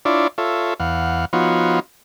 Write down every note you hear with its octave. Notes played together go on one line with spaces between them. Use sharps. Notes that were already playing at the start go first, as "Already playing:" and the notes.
D4 E4 F4 C#5 D5
F4 A4 C#5 E5
E2 F5 F#5
F3 B3 D#4 F4 F#4 C#5